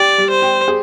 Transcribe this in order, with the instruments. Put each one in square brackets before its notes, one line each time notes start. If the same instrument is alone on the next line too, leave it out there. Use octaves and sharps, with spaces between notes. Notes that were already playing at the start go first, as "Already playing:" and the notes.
Already playing: [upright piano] G4 [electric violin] D5
[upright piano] G3
[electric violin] C5
[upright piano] G4
G#4